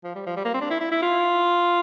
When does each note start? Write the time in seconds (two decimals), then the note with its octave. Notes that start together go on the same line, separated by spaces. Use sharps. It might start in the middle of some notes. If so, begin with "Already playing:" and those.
0.04 F3
0.15 G3
0.27 F3
0.37 G3
0.45 A#3
0.54 C4
0.61 D4
0.70 E4
0.81 E4
0.92 E4
1.02 F4